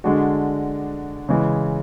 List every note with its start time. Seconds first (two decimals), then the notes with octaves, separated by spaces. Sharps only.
0.04 D3 G#3 D4 F#4
1.29 C#3 E3 G#3